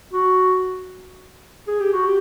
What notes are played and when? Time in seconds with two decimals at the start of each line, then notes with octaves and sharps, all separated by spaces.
0.13 F#4
1.68 G#4
1.80 G4
1.93 F#4
2.05 G4